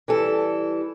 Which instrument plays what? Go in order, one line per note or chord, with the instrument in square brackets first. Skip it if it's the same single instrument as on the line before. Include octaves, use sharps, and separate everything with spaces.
[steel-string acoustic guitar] E3 G3 A4